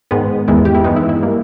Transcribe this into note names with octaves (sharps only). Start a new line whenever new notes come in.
G#2 D#3 G#3 B3
E2 D#3 G#3 B3 E4
G4
E4
G2 E3 G#3 B3 D#4
E4
E4
G3 A#3